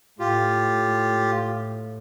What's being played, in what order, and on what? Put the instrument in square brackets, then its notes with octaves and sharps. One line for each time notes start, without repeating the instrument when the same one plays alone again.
[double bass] A2 [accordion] F4 G4